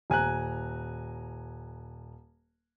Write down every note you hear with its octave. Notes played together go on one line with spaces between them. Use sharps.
D#1 G#5 A#5 F#6